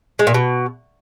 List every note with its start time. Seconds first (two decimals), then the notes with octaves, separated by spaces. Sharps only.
0.19 G#3
0.27 A#2
0.34 B2